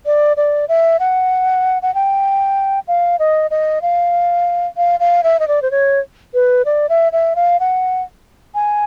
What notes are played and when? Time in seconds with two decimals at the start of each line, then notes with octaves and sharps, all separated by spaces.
0.06 D5
0.37 D5
0.69 E5
1.00 F#5
1.83 F#5
1.95 G5
2.88 F5
3.19 D#5
3.51 D#5
3.82 F5
4.77 F5
5.00 F5
5.23 E5
5.40 D#5
5.48 D5
5.62 C5
5.71 C#5
6.34 B4
6.65 D5
6.89 E5
7.12 E5
7.36 F5
7.60 F#5
8.55 G#5